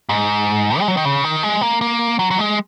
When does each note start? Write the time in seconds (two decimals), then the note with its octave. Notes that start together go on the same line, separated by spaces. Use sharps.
0.09 G#2
0.79 G#3
0.88 F#3
0.97 D#3
1.05 C#3
1.24 D#3
1.43 G#3
1.62 A#3
1.81 A#3
2.19 F#3
2.30 F#3
2.39 G#3